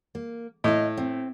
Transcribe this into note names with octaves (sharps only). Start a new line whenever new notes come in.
A#3
A2 D#5 F5
C4